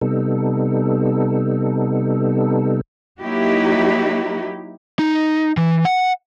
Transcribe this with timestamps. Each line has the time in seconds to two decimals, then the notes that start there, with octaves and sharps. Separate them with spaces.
0.01 C3 G3 B3 D#4 A4
3.20 F#3 A#3 D#4 E4 F#4 G4
4.99 D#4
5.57 E3
5.85 F#5